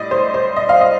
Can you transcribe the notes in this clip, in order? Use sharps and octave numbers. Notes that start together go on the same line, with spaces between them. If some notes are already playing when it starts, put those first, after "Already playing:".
Already playing: A2 G3 D5 D#5
C5
C5
D#5
F5
D#5